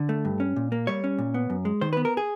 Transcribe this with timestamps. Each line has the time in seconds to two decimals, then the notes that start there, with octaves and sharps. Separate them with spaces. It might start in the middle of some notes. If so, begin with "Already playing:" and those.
Already playing: D3
0.09 A3
0.25 G2
0.40 C#4
0.56 A#2
0.72 A#3
0.87 G3 C#5
1.04 C#4
1.18 A#2
1.34 B3
1.50 F#2
1.65 G#3
1.81 D#3 C5
1.93 B3 B4
2.05 A#4
2.17 G#4